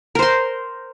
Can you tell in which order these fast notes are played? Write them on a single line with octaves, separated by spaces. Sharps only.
A#4 C5 C6